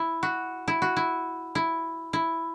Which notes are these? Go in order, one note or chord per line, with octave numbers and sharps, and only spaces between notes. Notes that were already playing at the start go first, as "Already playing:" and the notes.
Already playing: E4
F#4
E4
F#4
E4
E4
E4